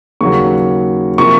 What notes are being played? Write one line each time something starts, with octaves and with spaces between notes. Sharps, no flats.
D#2 C#3 F#3 C#6
C3 F3 A#3 C#6